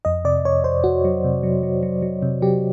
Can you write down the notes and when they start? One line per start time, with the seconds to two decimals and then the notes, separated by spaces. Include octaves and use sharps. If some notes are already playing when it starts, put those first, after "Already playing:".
0.05 F2 D#5
0.24 C3 D5
0.45 F2 C#5
0.64 F2 C5
0.84 F2 F#4
1.05 F#3
1.24 C3
1.43 F#3
1.63 F#3
1.83 F#3
2.02 F#3
2.22 C3
2.42 F#3 G4